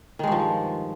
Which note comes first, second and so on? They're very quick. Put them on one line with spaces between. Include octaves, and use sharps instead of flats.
D#3 G#3 G2 F3